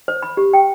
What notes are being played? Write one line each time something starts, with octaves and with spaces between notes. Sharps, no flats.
C5
B5
G4
G5